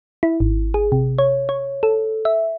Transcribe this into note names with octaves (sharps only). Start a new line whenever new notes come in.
E4
G#1
G#4
C3
C#5
C#5
A4
E5